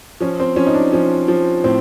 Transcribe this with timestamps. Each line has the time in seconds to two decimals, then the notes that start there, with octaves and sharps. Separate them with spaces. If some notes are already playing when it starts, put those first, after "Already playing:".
0.21 F3 C#4
0.40 C4
0.56 F3 C#4
0.67 D#4
0.74 D4
0.92 F3 C#4
1.28 F3
1.64 A2 C4